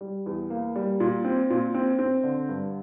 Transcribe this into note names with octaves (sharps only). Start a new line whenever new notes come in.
G3
E2
A#3
G3
A#2
C4
A#2
C4
C4
D3
G2